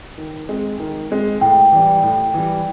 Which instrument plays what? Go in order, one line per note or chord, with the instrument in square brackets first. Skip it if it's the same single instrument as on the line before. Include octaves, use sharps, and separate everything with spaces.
[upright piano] D#3
G#3 C4
D#3
G#3 C4
[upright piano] A2 [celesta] G5
[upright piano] E3 G3
A2
E3 G3